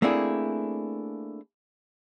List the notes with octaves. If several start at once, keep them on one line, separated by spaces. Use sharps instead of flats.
A3 A#3 C4 D4 E4 G#4